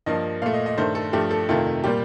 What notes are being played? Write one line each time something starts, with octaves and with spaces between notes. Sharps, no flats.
G2 F3 A#3 D#5
A#2 A3 F5
D#5
D#5
G2 D#3 A3 C5
A4
G2 F3 A3 G4
A4
F2 C3 D#3 A3 F4
A#2 G3 A#3 G4